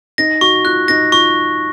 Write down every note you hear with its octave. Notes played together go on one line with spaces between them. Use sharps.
D#4 A#6
F#4 C#6
F4 F#6
D#4 A#6
F4 C#6